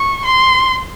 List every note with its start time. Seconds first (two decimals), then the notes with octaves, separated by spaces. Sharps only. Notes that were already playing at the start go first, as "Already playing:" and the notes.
Already playing: C#6
0.25 C6